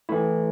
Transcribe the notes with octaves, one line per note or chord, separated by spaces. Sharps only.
E3 A3 E4